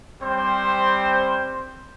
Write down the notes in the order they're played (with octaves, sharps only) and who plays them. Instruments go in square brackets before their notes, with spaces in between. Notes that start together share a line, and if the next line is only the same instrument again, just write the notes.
[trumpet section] G3 C4 C5